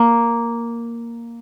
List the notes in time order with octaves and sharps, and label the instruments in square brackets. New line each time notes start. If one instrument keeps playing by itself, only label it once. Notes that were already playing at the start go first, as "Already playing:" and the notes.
Already playing: [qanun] A#3